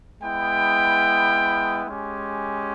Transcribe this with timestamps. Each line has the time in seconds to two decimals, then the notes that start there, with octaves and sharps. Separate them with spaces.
0.21 G#3 B3 E4 G5
1.86 G#3 C#4 G4